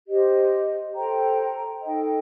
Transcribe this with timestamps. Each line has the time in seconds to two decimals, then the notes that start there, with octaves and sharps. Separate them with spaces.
0.07 G4 C5 D#5
0.94 A4 C5 G5 A#5
1.81 D#4 A4 D#5 G5